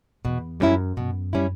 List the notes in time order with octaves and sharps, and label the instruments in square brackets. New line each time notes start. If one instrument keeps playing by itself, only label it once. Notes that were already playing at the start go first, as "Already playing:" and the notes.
[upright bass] E2 [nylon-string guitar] B2
[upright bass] F#2 [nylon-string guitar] G3 C#4 E4
[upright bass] F#2 [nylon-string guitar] B2
[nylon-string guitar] G3 C#4 E4